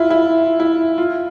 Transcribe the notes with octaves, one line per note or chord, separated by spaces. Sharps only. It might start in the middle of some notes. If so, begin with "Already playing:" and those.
Already playing: E4 F4
E4
E4
F4